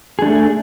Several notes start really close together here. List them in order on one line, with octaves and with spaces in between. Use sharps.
G#4 D4 A3